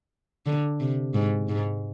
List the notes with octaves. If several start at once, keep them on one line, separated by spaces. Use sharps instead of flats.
D3
C3
G#2
G#2